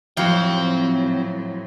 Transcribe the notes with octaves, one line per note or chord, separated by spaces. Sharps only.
F2 A2 F#3 C4 F#4 F5 G5